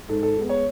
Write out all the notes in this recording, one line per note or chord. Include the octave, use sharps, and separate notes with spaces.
G#2 A4
A4
G#3 B3
C#5